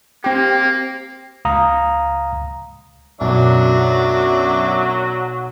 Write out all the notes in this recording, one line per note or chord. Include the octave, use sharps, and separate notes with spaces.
A#3 C4 G4
C#2 F5 A#5 D#6
B1 F#2 F#3 D4 E5 D6